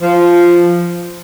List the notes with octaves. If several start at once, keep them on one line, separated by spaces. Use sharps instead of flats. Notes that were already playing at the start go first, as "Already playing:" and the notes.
F3